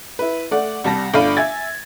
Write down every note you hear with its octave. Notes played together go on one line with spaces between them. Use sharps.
E4 B4
A3 D5 F#5
C2 G3 A5 A#6
G1 A3 D4 F5 B5 D#7
E5 G#5 G#6 A6